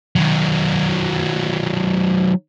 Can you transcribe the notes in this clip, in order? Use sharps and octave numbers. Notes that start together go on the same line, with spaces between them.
D#3 F#3